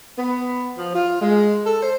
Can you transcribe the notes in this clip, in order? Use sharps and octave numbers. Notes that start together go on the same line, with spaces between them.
B3
F3
F4
G#3
A4
C5